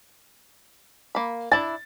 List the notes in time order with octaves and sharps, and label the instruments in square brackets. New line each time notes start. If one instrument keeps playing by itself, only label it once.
[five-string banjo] A#3 B5
[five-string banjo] D4 E4 G#5 [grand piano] A6